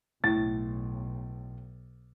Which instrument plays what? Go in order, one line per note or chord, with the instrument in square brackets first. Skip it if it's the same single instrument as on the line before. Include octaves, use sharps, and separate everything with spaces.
[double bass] B1 [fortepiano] A2 [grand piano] A6